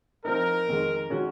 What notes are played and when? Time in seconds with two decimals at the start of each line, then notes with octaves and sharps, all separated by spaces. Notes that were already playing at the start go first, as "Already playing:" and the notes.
0.25 F3 C4 D#4 A#4
0.68 F2 D#3 G#3
1.10 D#3 G#3 C#4 F#4